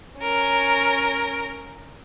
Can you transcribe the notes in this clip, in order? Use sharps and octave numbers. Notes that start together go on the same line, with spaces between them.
C#4 A#4